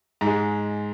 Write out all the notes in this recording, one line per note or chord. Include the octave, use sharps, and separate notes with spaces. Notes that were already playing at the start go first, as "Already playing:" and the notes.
G#2
G#3